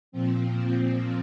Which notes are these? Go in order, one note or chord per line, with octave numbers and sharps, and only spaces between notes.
A#2 F3 C4